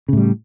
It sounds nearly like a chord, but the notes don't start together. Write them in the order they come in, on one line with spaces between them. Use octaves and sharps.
C#3 A2 G3